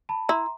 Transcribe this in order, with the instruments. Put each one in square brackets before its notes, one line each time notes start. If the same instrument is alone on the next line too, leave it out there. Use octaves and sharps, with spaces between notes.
[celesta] A5 B5
[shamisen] E4 [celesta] A#5 C6